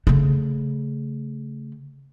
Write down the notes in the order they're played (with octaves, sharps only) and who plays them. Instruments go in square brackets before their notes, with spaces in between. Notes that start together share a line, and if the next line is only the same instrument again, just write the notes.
[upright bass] C#3 A3